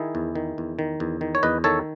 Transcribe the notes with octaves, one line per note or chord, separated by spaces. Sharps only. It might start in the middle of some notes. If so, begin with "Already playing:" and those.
Already playing: D#3 E4 G#4
E2
D#3
E2
D#3
E2
D#3
C#5
E2 B4 D#5
D#3 A4 C#5